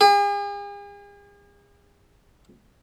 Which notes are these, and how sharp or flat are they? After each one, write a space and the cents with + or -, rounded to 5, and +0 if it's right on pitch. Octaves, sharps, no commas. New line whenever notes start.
G#4 -45